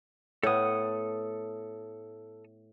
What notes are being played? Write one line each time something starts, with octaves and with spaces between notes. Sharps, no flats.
A2 B3 A4 D#6